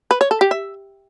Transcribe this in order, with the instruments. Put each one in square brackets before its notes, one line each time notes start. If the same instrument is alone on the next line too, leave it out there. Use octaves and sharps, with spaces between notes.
[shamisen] B4
C#5
A4
G4
E5